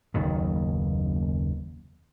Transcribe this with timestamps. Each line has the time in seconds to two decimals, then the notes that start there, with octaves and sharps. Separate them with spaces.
0.14 F#1 D#2 B2 D#3